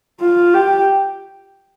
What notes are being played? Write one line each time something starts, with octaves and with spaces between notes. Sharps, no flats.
F4
G4